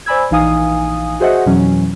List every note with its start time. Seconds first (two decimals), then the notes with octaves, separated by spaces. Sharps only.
0.06 C5 D5 G#5 B5 E6 G#6
0.31 A#1 E3 D#4 F5 G#5 D#6
1.20 F#4 G#4 C5 D#5 E5 F#5
1.46 F2 B2 E3 F#3 C#4